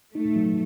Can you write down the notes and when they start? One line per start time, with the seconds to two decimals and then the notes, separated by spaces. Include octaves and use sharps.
0.15 A3 D#4
0.36 F#3